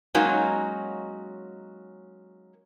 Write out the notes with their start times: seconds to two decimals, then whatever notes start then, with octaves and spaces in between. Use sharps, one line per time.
0.14 F#3 G#3 A#3 C#4 D#4 F#4